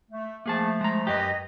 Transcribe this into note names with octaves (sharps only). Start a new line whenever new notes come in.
A3
F3 A3 A#3 G#4 A5
G#3 A#5
F#2 F#3 G4 B4 D#5